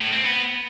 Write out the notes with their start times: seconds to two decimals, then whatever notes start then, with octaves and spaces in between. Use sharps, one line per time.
0.01 A2
0.13 C4
0.25 B3